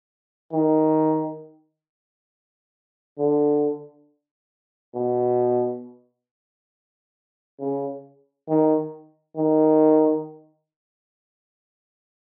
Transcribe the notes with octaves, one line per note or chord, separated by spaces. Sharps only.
D#3
D3
B2
C#3
D#3
D#3